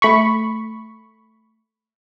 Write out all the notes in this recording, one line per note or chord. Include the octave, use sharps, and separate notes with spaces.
A3 B5 C#6